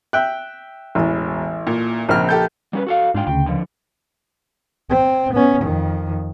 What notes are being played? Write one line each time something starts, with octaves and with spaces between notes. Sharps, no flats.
E5 G5 F#6
E1 A1
A#2
A#1 C#3 C4 F6
G4 A4 G6
G3 C#4 B4
F#4 A4 F5
G#2 D4 F4 G5
D2 C#3 G5
D3 F3
C4
B3 C#4
F2 D#3